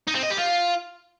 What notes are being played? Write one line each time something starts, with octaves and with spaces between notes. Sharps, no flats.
D#4
C4
D#5
G4
F4